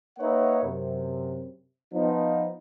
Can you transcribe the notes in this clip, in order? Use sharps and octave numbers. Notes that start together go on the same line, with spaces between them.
A#3 D#4 B4 C#5 E5 F#5
F#2 C3
F3 B3 D#4